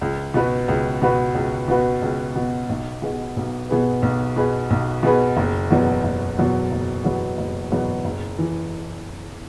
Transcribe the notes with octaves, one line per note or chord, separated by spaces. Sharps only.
C#2
B2 B3 F#4 B4
C#2
B2 B3 F#4 B4
C#2
B2 B3 F#4 B4
C#2
B2 B3 F#4 B4
B1
B2 B3 G#4 B4
B1
B2 B3 G#4 B4
B1
B2 B3 G#4 B4
B1
B2 B3 G#4 B4
F#1
E2 B2 F#3 B3
F#1
E2 B2 F#3 B3
F#1
E2 B2 F#3 B3
F#1
E2 B2 F#3 B3
F#1
E3